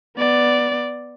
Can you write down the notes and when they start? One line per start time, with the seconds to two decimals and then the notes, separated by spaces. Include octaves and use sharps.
0.17 B3 D5